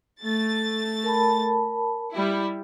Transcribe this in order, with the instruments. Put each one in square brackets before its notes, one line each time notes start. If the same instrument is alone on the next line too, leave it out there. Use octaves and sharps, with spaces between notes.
[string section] A3 A6
[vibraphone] A#4 A5 B5
[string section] G3 E4